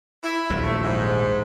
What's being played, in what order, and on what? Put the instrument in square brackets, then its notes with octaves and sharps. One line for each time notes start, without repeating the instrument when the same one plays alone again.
[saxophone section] E4
[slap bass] D#1 A#1 F#3
[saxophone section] A3
G#2